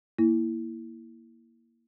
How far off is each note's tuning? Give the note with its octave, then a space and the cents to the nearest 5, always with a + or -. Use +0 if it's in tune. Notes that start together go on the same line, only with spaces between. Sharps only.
A#3 +0 E4 +0